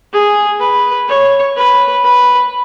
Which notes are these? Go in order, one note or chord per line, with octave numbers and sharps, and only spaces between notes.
G#4
B4
C#5
B4
B4